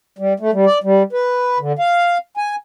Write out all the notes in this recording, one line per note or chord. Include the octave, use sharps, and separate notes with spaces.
G3
A3
G3
D5
G3
B4
D3
F5
G#5